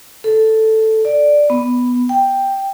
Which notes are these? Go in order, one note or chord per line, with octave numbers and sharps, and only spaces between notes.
A4
D5
B3
G5